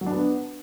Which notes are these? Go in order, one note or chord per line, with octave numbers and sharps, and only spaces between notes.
F#3
D4
B3